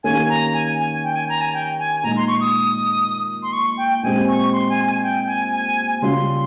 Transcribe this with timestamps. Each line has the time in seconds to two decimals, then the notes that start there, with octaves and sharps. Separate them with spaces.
0.04 D#3 A#3 C#4 G4 G#5
0.29 A#5
0.54 G#5
0.79 G#5
1.04 G5
1.16 G#5
1.29 A#5
1.41 G#5
1.54 G5
1.79 G#5
2.03 A#2 G#3 D#4 A#5
2.16 C6
2.28 C#6
2.41 D#6
3.43 C6
3.53 C#6
3.77 G5
4.03 A#2 G#3 C4 G4 G#5
4.28 C#6
4.52 C6
4.69 G#5
4.86 G#5
5.03 G5
5.27 G#5
5.52 G#5
6.02 C#3 G3 C#4 F4 C6